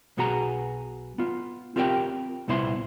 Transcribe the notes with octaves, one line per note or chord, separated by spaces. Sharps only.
B1 B2 B3 F#4 G#4 A#5
B3 F4
C4 F4 G4 A#4 D#5 G5
C2 A#2 B3 E4 C5 C6